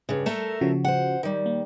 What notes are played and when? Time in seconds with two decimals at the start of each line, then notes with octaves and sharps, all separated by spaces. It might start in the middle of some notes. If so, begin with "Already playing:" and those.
0.09 G2 C#3
0.26 A3 A4 A#4
0.61 C#3 F3 F#4
0.85 C5 F#5
1.23 D#3 G3
1.46 A#3